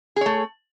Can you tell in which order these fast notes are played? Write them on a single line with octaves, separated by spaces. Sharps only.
G#4 C#5 A3